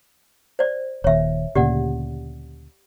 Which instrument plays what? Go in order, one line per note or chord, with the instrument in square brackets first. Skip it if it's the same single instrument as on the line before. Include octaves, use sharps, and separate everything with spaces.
[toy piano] C5 D5
[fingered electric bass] D#1 D#2 [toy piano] C#5 E5
[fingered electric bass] D2 A#2 C#3 [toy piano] G4 D5 F#5